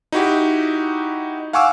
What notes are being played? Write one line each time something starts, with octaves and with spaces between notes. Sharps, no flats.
D#4 E4 F#4 G4
F5 F#5 G#5 C#6 D6 E6